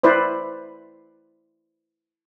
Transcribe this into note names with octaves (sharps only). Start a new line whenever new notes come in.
E4 B4 C5 D5